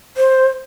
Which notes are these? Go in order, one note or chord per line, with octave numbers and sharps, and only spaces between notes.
C5